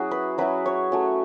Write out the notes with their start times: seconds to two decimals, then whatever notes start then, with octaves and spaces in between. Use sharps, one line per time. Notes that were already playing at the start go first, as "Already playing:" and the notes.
Already playing: F#3 C#4 E4 F#4 G#4
0.11 B4
0.38 F#3 C#4 E4 B4
0.66 C#5
0.92 F#3 A3 C#4